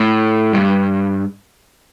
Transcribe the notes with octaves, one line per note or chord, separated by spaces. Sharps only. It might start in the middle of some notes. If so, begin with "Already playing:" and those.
Already playing: A2
G2